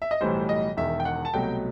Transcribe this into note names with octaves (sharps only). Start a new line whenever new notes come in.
E5
D#5
B1 A2 E3 G3 C5
D#5
E1 E2 D#3 E5
G5
F#5
A5
C2 B2 F#3 A3 G5